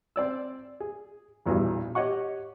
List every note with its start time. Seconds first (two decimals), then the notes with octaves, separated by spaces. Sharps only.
0.16 C4 D5 E6
0.80 G#4
1.46 A#1 E2 G2 B2
1.95 G4 C#5 D#5 F#5 C#6